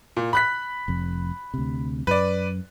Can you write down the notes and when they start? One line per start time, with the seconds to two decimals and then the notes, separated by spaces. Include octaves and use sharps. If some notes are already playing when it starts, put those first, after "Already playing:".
0.17 A#2
0.33 B5 F#6 B6
0.88 F1 F2
1.54 D2 C3
2.07 F#2 B4 D5